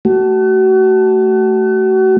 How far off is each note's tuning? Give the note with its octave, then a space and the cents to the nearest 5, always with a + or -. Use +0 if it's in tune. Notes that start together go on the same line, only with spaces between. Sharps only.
A3 +0 F#4 +35